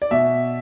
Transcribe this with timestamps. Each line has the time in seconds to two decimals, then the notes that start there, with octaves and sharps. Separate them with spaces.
0.02 D5
0.11 B2 E5